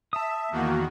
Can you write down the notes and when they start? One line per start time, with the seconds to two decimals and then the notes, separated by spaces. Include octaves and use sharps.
0.13 E5 A5 D#6
0.51 E2 D#3 A#3 F#4